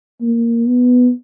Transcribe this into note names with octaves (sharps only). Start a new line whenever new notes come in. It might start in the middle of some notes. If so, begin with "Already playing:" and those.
A#3
B3